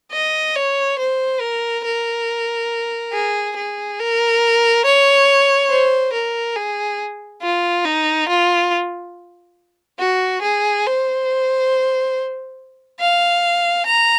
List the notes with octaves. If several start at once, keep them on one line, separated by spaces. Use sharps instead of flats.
D#5
C#5
C5
A#4
A#4
G#4
G#4
A#4
C#5
C5
A#4
G#4
F4
D#4
F4
F#4
G#4
C5
F5
A#5